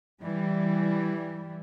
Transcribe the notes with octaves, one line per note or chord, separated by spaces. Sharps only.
E3 G3